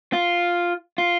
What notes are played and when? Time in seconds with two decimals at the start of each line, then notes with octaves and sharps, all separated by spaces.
0.13 F4
0.98 F4